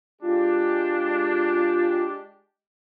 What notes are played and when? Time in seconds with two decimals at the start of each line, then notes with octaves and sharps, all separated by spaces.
0.22 G#3 D4 F4 G4